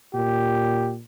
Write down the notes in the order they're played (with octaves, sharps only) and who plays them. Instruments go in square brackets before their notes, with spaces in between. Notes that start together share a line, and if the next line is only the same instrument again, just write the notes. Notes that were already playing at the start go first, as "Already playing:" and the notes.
[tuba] A#2 [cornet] G4